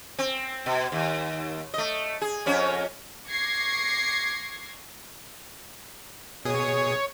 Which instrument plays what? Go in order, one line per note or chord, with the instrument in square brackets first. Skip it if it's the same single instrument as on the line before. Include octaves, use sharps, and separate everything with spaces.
[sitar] C4
B2
D#2
A3 D#5
G#4
F2 C#4 C#5
[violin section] C#6 D6 G#6 A#6 C7
[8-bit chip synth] B2 G#4 D#6 [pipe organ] C#5